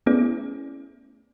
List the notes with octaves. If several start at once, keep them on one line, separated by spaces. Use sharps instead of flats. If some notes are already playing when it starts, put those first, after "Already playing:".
A3 B3 C#4 E4 G#4 D5